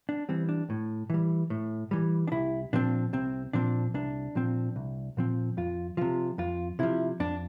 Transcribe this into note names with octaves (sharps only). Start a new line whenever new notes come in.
D4
E3 G3 C4
D4
A2
E3 G3
A2
E3 G3
D4
C2 E4
A#2 F3 C4 D4
C2 C4
A#2 F3 C4 D4
C2 D4
A#2 F3 C4
C2
A#2 F3 C4
F2 F4
C3 F3 F4
F2 F4
C3 F3 E4
F2 D4